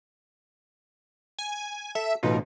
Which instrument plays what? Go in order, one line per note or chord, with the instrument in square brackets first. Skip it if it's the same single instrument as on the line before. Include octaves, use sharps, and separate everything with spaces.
[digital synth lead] G#5
[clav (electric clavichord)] A4 [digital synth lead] E5
[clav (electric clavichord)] A1 D#4 F4 [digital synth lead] B2